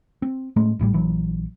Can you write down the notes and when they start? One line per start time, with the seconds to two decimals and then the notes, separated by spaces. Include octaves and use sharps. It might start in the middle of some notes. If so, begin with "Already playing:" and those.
0.22 C4
0.56 A2 G#3 A3 C#4
0.79 G#1 A2 D#3 G3
0.94 A#1 E3 F#3